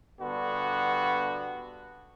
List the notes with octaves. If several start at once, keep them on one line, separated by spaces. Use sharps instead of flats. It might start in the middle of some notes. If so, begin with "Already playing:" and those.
G2 D3 B3 F#4